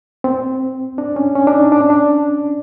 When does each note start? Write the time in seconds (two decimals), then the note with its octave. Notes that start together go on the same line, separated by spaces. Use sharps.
0.24 C4
0.98 D4
1.16 C#4
1.35 C#4
1.47 D4
1.53 D#4
1.72 D4
1.81 C#4
1.90 D4